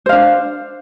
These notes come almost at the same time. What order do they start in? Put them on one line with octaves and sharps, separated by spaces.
C5 F5 D4